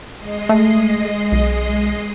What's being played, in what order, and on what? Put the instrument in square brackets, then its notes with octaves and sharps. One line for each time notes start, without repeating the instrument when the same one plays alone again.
[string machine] G#3 D#5 C7
[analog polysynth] A3
B1